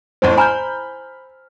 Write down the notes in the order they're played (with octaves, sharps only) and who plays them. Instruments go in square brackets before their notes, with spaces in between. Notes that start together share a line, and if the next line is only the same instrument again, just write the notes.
[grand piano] A1 F2 A2 [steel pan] C5
[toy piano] G#5 A#5 [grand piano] B5 F6 G6